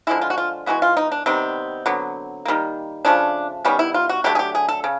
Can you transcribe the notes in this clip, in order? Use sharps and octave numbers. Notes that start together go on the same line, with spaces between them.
D3 F3 G#3 E4
F4
F#4
F4
E3 G#3 B3 F#4
F4
D#4
D4
C3 D#3 G3 B3 C4
D3 F#3 B3
D#3 G3 A#3
C#3 F3 A3 D4
D#3 G3 B3 C#4
E4
F4
F#4
D3 F#3 A3 G4
G#4
G4
G#4
A4
C#3